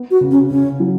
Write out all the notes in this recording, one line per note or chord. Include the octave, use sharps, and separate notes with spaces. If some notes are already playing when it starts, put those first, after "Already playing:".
Already playing: B3
F#4
C#3
C#4
C#3 C#4
F#3